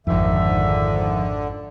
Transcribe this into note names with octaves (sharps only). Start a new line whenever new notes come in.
G#1 F2 G#2 D3 D#3 F3 E5